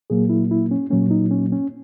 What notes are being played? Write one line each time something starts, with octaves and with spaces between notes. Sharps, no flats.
A#2 F#3 A#3 G#4
E4
E4
C#4
A#2 F#3 A#3 C#4
D#4
C#4
C#4